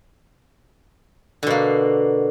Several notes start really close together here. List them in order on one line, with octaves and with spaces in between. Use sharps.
D3 B2 A#3